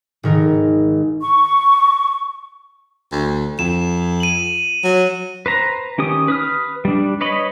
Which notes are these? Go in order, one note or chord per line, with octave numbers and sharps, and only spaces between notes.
G#1 D#3 A#4
C#6
D2
F2 E7
D#7 F#7
F#3
B4 C5 A#5
D#3 C#4 G4 D#6
B4 D#6 F6
G3 D4
B4 C#5 D#5 B5